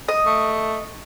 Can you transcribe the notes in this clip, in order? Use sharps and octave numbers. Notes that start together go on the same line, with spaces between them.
D#5
A3